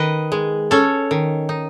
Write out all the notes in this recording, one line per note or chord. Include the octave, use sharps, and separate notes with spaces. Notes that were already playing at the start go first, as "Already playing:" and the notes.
Already playing: D#3 B4 D#5
G#3
C#4 A4 C#5
D#3
D#4